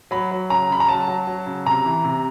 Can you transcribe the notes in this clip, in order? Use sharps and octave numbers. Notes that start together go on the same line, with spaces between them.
F#3 B5
F#3
C#3 A#5
C#3 B5
A#5
F#3 A5
F#3
F#3
C#3
C3 A#5
E3
C3